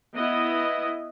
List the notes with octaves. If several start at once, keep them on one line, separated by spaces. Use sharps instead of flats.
B3 E4 D#5